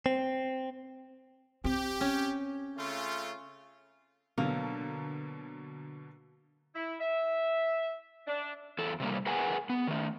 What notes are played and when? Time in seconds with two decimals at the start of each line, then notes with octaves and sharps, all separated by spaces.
0.06 C4
1.64 C4 G4
2.01 C#4
2.78 C#3 A3 F4
4.38 B2 D3 F#3 A#3
6.75 E4
7.00 E5
8.27 D4
8.78 E2 A4
9.00 C3 G3 A#3
9.26 G#4 A#4 B4 F#5 G#5
9.70 B3
9.88 D#3 A3